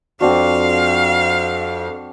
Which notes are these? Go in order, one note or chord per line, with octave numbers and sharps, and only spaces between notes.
F2 C4 D4 F#4 F5